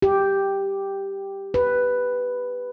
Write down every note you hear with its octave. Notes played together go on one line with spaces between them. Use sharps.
G4
B4